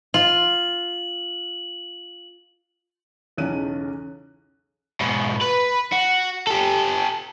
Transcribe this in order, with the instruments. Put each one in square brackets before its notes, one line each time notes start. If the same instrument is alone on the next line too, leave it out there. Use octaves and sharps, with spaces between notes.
[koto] F4 [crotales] F#7
[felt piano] B1 E2 C#3 C#4 F#6 D#7
[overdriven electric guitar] G#2 B2
B4
F#4
G4 A4